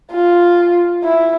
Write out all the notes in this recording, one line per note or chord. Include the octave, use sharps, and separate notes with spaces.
F4
E4